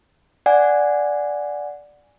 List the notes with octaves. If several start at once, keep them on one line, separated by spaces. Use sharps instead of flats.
D5 F#5 G#5